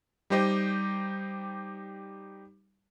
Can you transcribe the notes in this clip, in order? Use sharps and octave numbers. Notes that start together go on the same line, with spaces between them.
G3 D#4 G4 C5 D#5